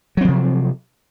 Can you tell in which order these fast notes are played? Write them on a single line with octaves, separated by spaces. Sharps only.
F#3 C4 F3 C3